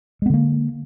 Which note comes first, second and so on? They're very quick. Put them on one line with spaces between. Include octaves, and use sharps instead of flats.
G#3 B3 D3 A#3